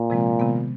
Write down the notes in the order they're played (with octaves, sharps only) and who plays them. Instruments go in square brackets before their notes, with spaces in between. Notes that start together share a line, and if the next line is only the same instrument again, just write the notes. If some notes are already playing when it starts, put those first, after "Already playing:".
Already playing: [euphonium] A#2
[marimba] C3 F3 G#3 C4
C3 D#3 G#3 B3